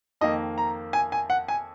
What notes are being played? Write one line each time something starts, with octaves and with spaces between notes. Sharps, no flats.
F2 D#3 A#3 D#5
A#5
G#5
G#5
F#5
G#5